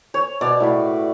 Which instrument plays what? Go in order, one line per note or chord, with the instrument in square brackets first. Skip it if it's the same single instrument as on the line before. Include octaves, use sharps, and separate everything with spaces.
[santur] C#5
[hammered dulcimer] B2 [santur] D5
[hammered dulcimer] A2 F#4 B4